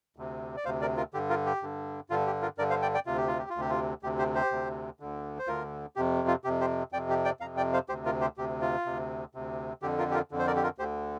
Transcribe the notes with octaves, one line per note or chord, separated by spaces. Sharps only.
D2 C3
D5
D2 C3 C5 F5
A#4 D5
F4 A#4
G2 D3 G4
F4 A#4
G4
G2 D3
G2 D3 F4
G4
F4 A#4
G2 D3 A#4 D5
C5 F5
D5 G5
D5 G5
D2 C3 F4
G4
F4
G4
F4
D2 C3 G4
F4
D2 C3 G4
G4 C5
G4 C5
D2 C3
D2 D3
C5
D2 D3 F4 A#4
F2 C3 G4
F4
F2 C3 G4
G4 C5
F2 C3 D5 G5
G4
D5 G5
F2 C3 F5 A#5
D5 G5
C5 F5
D2 C3 G4 C5
F4 A#4
G4 C5
D2 C3 G4
F4
D2 C3
D2 C3
F2 D3 G4
F4 A#4
G4
F4 A#4
F2 D3
C5
A#4 D5
G4
F4 A#4
D2 D3 G4 C5